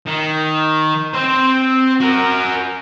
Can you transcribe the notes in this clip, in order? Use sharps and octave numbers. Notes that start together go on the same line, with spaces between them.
D#3
C4 C5
F#4 A#4